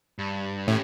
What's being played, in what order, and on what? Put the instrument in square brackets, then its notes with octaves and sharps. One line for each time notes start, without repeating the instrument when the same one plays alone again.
[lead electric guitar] G2
[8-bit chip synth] A2 [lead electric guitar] C#4 G4